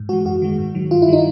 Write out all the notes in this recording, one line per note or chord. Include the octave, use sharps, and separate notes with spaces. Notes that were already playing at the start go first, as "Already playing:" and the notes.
Already playing: G#2
E3 G#3 F#4
F#2 F#4
D#3 G#3
G#2
D#3 F#3
G2 F4
E4
D#3 G3 D#4